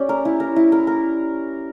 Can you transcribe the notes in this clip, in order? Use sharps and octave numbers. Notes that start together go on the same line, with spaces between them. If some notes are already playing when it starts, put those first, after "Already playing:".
Already playing: C#4 G4 D5
A#4
E4
A#4
E4
A#4
A#4